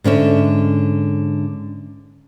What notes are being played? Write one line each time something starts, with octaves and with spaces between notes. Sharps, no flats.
G#2 D3 C#4 E5